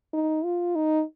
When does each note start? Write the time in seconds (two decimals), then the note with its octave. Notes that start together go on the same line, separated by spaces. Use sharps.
0.13 D#4
0.44 F4
0.75 D#4